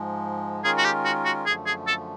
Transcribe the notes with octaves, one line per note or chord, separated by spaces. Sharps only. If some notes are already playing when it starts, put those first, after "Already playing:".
Already playing: G#2 F3 G#3
D#3 G#3 C#4 F4 G#4 A#4
F#4
G4
F#4
F#4
F#2 D3 F3 A3 G#4
G#4
A4